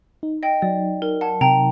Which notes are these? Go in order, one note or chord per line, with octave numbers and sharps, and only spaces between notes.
D#4
D#5 G5
F#3 D5
D#4 A#4
F#5 A5
C3 G5 A#5